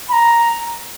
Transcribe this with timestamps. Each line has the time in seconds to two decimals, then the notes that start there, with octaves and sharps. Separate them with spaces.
0.09 B5
0.13 A#5